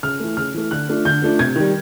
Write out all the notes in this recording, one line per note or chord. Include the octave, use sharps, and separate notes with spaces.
C#3 F6
E3 A3
C#3 F6
E3 A3
D3 F#6
F3 A3 D4
D3 G6
F3 A3 D4
C3 G#6
D#3 G3